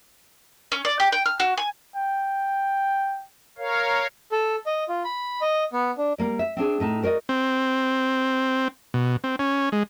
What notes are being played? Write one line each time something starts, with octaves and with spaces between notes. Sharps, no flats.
C#4
D5
G4
G5
F6
F#4
G#5
G5
A#4 C#5 F5
A4
D#5
F4
B5
D#5
B3
D4
G3 A#3 D5
E5
C4 D4 G#4
A2 D#4 A5
F#4 A#4 C5 D5 D#5
C4
B2
C4
C#4
G#3